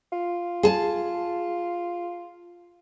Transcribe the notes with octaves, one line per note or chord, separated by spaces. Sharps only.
F4
G#4 A5